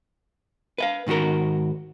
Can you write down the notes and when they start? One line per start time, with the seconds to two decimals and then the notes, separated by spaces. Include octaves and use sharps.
0.78 B4 E5 F5
1.07 G#2 D#3 F4 F#4 A#4